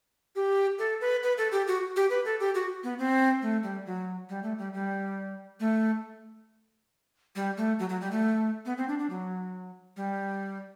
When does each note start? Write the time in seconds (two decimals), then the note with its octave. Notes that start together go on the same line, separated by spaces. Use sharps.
0.36 G4
0.79 A4
1.01 B4
1.23 B4
1.38 A4
1.52 G4
1.67 F#4
1.96 G4
2.10 B4
2.25 A4
2.40 G4
2.55 F#4
2.84 B3
2.99 C4
3.42 A3
3.63 G3
3.86 F#3
4.29 G3
4.43 A3
4.58 G3
4.73 G3
5.60 A3
7.36 G3
7.57 A3
7.79 F#3
7.89 F#3
8.01 G3
8.11 A3
8.66 B3
8.78 C4
8.88 D4
8.99 D4
9.10 F#3
9.97 G3